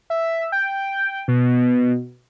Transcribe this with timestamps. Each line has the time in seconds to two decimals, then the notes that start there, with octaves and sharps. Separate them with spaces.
0.10 E5
0.52 G5
1.28 B2